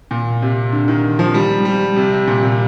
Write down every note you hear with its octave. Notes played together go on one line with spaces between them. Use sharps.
A#2
C3
D3
D#3
F3
G3
G3
C3
C3
A#2
C3